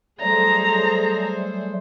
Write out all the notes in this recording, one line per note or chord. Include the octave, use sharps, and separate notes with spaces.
F#3 G3 A3 G#4 A4 C5 A#5